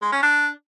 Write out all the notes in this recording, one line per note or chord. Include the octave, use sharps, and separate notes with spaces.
G#3
C#4
D4